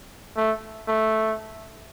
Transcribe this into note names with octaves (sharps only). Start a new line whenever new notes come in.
A3
A3